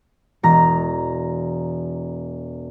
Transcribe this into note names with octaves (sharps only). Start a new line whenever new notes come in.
E1 A#5 A#6